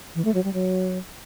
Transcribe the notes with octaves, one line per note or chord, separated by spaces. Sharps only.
E3
A3
F#3
G3
F#3